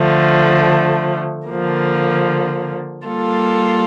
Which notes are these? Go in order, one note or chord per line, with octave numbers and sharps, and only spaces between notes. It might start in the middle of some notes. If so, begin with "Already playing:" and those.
Already playing: D3 F3 A3
D3 F3 A#3
G3 A#3 F4 A4